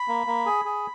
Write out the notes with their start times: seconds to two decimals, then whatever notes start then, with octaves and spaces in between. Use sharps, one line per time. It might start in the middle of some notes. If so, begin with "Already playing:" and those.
Already playing: B5
0.08 A#3
0.27 A#3
0.46 G#4
0.65 G#4